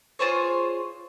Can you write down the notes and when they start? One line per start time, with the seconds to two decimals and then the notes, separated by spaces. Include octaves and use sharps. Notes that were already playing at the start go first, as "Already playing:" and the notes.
0.19 F4 G#4 C5 C#5